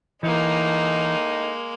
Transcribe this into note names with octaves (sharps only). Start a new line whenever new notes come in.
A2 E3 G#3 A#3 D#4